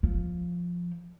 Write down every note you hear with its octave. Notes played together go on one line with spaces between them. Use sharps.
F3